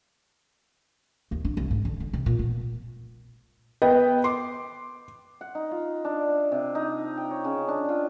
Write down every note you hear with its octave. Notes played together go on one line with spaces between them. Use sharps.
D#2
D4
C2
G#2
D3
D3
C3
A#2
B3
B3 B4 D#5 G5
C6 D6
F#5
D#4
F4
D4
D5
C3
D#4
G5
C#5
C#3
D4
F4